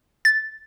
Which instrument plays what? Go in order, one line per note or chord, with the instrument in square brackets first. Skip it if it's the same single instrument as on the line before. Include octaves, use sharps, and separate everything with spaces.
[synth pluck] A6